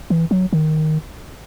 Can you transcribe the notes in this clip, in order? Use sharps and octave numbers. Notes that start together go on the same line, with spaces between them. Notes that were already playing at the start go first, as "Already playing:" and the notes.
E3
F#3
D#3